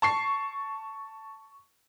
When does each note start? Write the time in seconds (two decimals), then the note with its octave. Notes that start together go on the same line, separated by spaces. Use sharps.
0.02 A5 C#6 C7